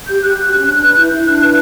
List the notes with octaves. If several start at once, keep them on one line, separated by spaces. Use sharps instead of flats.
G4 G6
G4 F#6
F#4
C#4
D4 F#6
B4
E4 G6
E4
D4 F#6
B4 F#6